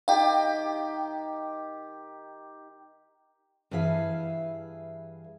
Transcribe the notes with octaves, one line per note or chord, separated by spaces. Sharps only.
D#3 G4 F5 G5
G2 E3 G#4 E5 F5